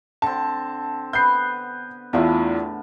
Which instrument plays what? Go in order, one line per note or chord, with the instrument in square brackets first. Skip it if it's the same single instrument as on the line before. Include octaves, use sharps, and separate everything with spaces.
[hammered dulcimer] D3 C4 [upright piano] A5
[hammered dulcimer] B3 B4 [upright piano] G6 C7
[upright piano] E2 E4 F4 [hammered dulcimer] A2 D3